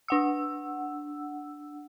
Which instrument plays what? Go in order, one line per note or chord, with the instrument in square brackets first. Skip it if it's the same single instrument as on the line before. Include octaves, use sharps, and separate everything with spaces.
[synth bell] D4 F#5 E6